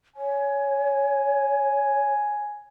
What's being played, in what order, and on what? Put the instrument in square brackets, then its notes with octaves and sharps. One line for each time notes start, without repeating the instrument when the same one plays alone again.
[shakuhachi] C#5 [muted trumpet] G#5